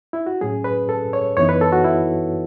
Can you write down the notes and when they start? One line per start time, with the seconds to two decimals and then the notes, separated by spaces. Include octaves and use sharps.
0.13 E4
0.26 F#4
0.41 A2 F#3 C#4 G#4
0.64 B4
0.89 A4
1.13 C#5
1.37 F#2 E3 B3 D#4 C#5
1.49 B4
1.61 A4
1.72 F#4
1.84 E4